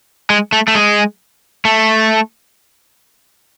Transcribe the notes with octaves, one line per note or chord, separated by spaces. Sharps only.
G#3
A3
A3
G#3
A3